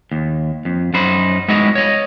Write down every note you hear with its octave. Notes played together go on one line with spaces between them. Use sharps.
D#2
F2
F#2 D#4 C5 B5
G#3 B3 D#4 E4 F#4 D#5
C#5 D#5